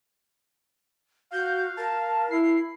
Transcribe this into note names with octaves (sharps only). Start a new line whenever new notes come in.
F#4 F5 G6
A#4 A5
E4 C7